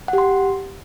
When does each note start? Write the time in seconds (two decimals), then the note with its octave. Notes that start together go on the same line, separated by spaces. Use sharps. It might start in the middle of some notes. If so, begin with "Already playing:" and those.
0.08 F#5
0.13 G4
0.18 C6